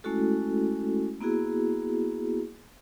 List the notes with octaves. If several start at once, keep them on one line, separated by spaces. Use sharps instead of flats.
G#3 A3 C#4 E4 F#4 A4
A#3 B3 E4 F#4 G#4